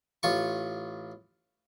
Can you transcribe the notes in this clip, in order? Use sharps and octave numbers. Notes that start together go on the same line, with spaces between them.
A1 F4 C#6